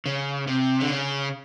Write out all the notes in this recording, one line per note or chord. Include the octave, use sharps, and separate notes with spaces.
C#3
C3
D3
C#3